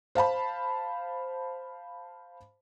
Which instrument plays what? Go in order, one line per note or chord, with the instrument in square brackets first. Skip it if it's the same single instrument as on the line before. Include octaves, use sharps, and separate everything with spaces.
[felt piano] C5 F5 A5 B5